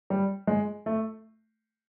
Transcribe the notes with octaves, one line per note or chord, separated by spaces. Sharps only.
G3
G#3
A3